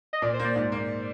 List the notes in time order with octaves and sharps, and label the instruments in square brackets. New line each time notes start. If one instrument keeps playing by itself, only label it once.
[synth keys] D#5
[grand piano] A#2 [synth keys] D5
[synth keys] C5
[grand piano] A#3 [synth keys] D5
[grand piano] G#2
A#3